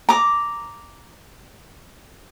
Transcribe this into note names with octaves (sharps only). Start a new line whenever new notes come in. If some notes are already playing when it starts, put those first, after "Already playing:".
A#5 D6